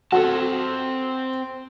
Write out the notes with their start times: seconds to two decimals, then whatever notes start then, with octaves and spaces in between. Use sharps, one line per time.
0.12 C4 F#4 A4 A5